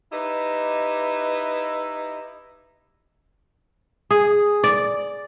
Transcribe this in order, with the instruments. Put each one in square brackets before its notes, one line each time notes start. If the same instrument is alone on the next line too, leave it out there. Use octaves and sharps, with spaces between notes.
[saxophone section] D#4 E4 G4 B4 D#5
[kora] G#4
D5